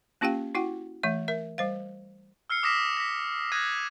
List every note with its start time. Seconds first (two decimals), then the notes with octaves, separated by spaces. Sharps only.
0.21 A#3 C#4 F4 G4 F5 G5
0.55 E4 F#4 F#5 G5
1.03 E3 A3 E5
1.28 A#4 E5
1.58 G3 C5 F5
2.50 E6 F6 C7 C#7
2.63 D6 D#6 F6 A#6 B6 E7
2.97 A#6 B6
3.52 D#6 F#6 G#6 A#6 D#7